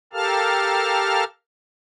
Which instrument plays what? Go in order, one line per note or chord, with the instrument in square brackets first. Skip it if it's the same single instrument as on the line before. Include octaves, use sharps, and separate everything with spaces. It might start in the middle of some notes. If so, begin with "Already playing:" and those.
[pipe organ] G4 A4 A#4 F5 A5 F6